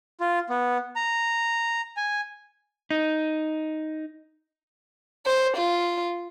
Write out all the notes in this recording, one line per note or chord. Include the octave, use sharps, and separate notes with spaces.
F4
B3
A#5
G#5
D#4
C5
F4